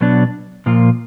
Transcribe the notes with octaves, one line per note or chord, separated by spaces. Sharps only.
B2 F#3 B3 D4
A#2 F3 A#3 F4